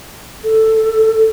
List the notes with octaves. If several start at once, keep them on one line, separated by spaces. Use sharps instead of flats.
A4